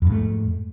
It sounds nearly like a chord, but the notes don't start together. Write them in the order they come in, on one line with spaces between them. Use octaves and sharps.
F2 G#2 A3